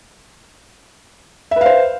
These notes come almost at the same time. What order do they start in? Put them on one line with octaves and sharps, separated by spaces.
E5 B4 F5 C5